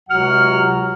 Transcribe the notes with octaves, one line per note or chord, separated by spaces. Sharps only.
C#2 C3 F#3 F#4 F#5 F6